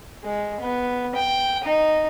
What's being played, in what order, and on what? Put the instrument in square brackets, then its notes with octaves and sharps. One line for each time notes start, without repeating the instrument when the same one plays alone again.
[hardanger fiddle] G#3
B3
G5
D#4